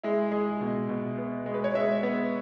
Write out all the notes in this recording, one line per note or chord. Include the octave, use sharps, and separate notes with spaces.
G#3 E4
G#3 G#4
B2
B2
B3
G#3
B4
C#5
G#3 E5
B3